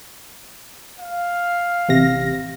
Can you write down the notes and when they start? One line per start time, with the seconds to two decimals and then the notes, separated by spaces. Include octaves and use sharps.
1.00 F5
1.89 A1 C3 A#6